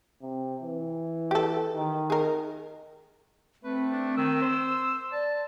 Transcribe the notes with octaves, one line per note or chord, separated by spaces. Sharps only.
C3
E3
G4 A4
D#3
G#4 A#4
A3 C4 B4
D4
D#3 E6
C5
D5 A5